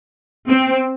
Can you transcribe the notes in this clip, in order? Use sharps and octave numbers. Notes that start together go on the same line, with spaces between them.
C4